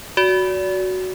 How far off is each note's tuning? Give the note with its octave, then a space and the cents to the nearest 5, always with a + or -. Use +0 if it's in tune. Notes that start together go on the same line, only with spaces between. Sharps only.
F#4 +0 D5 -35